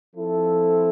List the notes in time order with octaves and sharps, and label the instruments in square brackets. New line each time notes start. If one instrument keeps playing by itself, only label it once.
[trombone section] F3 C4 E4 A4